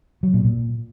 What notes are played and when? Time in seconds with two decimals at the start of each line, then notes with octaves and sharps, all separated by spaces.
0.23 F#3
0.34 A#2
0.44 A#2